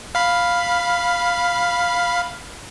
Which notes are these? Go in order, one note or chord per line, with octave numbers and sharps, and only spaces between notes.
F5 B5